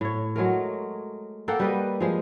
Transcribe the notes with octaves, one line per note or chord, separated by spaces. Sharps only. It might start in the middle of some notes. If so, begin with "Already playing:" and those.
A2 C#5
F#3 G#3 A3 A#4
A#3 A4 F#5 G5
G3 A#3 B4 D#5
F3 G#3